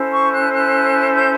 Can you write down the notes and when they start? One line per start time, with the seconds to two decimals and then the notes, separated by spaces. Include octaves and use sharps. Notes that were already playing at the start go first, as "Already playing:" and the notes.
Already playing: C#4 E4 A4 C5
0.11 C#6
0.32 F#6
0.53 F#6
1.15 G6